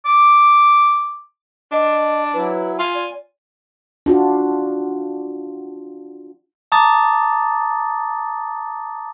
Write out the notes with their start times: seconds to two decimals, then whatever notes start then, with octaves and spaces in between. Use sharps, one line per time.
0.06 D6
1.72 D4 D#5
2.34 F#3 E4 B4
2.79 F4 G#5
2.95 D5
4.06 D4 F4 F#4
6.72 A5 A#5 D6 D#6 A6